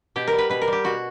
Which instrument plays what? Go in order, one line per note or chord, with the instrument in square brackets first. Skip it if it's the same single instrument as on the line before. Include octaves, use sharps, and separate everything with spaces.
[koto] B2 G4
A#4
G3
B4
B2 B4
A#4
G3 G4
B2 F#4